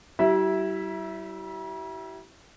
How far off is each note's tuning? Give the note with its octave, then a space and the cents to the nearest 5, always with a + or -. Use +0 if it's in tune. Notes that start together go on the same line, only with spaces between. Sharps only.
G3 -40 E4 +0 E5 -5